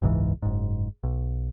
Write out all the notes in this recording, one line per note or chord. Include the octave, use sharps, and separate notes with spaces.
F#1 C#2 G#2 E3
F#1 G#2
B1